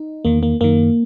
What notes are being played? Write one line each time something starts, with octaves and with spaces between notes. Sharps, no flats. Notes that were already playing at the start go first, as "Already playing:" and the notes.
Already playing: D#4
E2 D#3 A#3
A#3
F#2 D#3 A#3